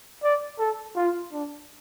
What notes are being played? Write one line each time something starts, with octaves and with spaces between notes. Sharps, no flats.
D5
A4
F4
D4